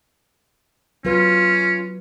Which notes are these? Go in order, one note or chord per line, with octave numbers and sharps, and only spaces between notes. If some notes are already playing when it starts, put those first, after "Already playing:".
F#3 C#4 F4 B4